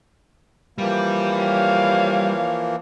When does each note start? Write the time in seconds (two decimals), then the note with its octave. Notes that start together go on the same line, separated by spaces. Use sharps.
0.78 E3 F3 G3 A#3
1.38 C#5 F5